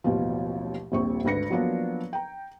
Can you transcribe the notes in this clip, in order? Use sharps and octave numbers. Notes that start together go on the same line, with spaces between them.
A1 D#2 B2 F3
D#1 A#1 C4 C#6
G#1 D2 B4 A#6 C#7
F3 F#3 A#3 B3 D4 D5
G5 A#5